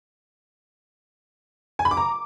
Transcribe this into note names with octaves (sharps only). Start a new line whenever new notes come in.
G#5
B5
D6
A#5